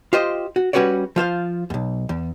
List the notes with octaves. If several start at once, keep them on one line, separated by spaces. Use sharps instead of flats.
F4 G4 C5 D#5
F#4
G3 C#4 F#4 B4 C#5 D5
F3 F4 C5 F5
B1 E2
E2